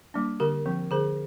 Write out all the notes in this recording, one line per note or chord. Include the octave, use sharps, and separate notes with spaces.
G3 A#3 D4
D3 G4 A#4
F3 C4
D3 G#4 C5